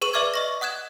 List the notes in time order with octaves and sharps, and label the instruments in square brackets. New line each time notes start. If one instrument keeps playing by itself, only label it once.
[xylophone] G#4 B4 C#6 D#7 E7 F#7
B4 D5 E5 D6 F6 G#6
D#5 C#6 A#6
F#5 D#6 F#6 G#6 E7